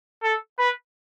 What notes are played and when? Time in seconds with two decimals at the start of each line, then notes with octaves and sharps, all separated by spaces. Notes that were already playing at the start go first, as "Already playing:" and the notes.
0.23 A4
0.59 B4